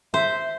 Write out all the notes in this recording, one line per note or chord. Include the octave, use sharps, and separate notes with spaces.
C5 E5